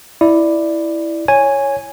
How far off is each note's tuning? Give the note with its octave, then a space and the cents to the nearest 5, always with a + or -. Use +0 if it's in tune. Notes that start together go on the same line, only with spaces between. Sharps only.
E4 +0 D5 +10
C#5 +0 G#5 -5